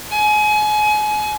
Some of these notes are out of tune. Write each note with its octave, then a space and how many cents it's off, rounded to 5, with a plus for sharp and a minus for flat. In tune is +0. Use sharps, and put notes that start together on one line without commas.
G#5 +30